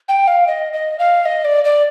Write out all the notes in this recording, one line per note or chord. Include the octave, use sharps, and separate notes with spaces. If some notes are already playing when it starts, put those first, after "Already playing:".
G5
F5
D#5
D#5
F5
D#5
D5
D5